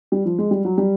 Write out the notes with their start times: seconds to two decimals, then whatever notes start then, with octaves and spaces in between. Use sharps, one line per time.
0.12 G3
0.25 F3
0.38 G#3
0.51 G3
0.65 F#3
0.78 G3